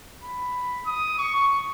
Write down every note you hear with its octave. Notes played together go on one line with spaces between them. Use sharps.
B5
D#6
C#6